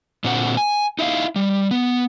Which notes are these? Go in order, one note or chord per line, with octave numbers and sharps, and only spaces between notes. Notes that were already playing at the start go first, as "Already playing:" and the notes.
A#2 D3 C4 F#4 A#4 F#5
G#5
D#4 E4 D#5 F5
G3
B3